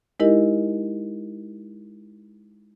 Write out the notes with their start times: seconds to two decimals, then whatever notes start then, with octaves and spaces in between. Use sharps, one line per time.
0.20 G#3 D#4 E4 G4 A#4 D#5